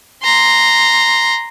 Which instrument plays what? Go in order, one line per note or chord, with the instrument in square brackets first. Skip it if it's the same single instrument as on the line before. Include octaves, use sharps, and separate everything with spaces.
[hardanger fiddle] A#5 C6